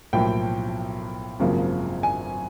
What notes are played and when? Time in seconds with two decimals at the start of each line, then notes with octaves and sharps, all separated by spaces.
0.13 B1 A2 F3 A#3 G5
1.40 G#1 F#2 C#3 F3 A#3
2.03 G#5